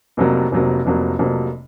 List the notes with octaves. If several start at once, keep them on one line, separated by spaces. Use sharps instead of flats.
F1 F2 C3 F#3 A#3
F1 F2 C3 F#3 A#3
F1 F2 C3 F#3 A#3
F1 F2 C3 F#3 A#3